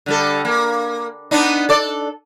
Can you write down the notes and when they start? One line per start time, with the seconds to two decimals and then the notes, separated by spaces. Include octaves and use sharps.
0.06 D3 G3 A4
0.45 A#3
1.31 B3 D4 D#4
1.69 A4 D5